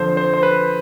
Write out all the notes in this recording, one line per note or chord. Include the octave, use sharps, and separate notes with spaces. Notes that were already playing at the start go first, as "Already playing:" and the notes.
Already playing: F2 D3 F3 C5
C5
C5
B4